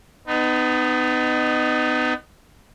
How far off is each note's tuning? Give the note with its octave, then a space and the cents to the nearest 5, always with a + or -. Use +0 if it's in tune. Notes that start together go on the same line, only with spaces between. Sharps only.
B3 +30 D#4 -20